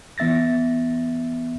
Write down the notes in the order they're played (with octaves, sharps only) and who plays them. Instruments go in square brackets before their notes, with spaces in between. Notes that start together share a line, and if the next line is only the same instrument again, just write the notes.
[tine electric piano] E3 B3 E5 A6 A#6